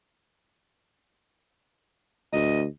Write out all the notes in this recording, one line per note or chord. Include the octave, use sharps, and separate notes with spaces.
D2 D#5